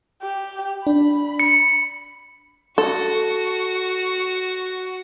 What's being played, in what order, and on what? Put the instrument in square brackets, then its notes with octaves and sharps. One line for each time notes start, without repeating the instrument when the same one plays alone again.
[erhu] G4
[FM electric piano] D4 [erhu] B5
[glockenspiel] C#7
[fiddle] F#4 [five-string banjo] A4